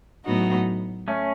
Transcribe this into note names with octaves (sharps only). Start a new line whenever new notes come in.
A2 F#3 B3 D#4 F#4
A3 C#4